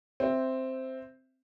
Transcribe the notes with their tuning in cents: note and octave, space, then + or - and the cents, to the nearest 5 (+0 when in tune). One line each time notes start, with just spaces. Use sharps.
C4 +0 E5 +0